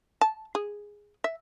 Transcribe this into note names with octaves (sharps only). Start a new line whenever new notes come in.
A5
G#4
E5